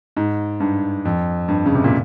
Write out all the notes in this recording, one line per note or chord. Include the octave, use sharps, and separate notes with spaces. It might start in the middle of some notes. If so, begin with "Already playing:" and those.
G#2
G2
F2
G2
C#3
C3
A#2